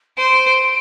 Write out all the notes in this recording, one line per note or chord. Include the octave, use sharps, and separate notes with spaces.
C5 D7